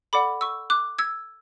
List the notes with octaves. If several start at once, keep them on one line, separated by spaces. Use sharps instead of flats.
A4 D5 F#5 B5 D6
C#6 E6
D6 F#6
E6 G#6